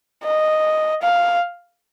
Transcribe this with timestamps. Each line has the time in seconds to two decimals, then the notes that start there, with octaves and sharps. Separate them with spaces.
0.24 D#5
1.02 F5